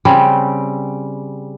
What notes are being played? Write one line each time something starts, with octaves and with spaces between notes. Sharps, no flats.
C#3 G3 C4